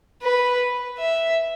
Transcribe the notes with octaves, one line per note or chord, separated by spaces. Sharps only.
B4
E5